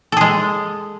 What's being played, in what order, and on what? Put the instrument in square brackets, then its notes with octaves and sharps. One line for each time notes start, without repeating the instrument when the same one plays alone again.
[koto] A4
G#4
G#3